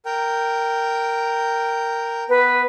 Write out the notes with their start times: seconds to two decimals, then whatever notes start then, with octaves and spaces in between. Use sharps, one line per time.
0.06 A#4 G5
2.29 B3 B4